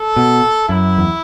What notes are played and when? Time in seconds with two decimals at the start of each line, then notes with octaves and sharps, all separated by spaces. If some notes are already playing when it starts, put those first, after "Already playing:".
Already playing: A4
0.16 B2
0.69 F#2 E4
0.98 E2